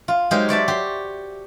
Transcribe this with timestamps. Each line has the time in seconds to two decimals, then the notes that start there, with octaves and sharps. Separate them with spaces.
0.08 F4
0.31 F#3 G#3 D#4 G4 A#4 C5
0.49 C#5 D5 E5 A5
0.68 F#4 G4 C6